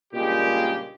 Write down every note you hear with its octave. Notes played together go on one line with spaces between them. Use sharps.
G2 A#2 C#3 G#3 G4